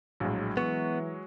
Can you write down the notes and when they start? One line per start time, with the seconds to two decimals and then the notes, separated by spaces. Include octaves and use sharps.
0.20 A#1 A2 F#3 G#3
0.57 E3 B3 C#6